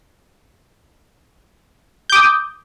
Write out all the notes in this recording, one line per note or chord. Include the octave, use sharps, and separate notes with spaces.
D6 D#6 G6